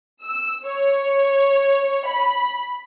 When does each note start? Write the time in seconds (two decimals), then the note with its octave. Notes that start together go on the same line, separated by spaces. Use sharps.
0.21 E6
0.66 C#5
2.06 B5